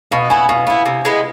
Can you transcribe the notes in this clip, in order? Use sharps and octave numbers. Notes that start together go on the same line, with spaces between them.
B2 F5
B3 E4 G#5
B2 F5
B3 E4 F5
C3
G#3 B3 E4